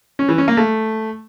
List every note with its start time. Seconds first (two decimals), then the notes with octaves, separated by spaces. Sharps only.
0.19 C#4
0.29 E3
0.38 C#4
0.48 A#3
0.57 A3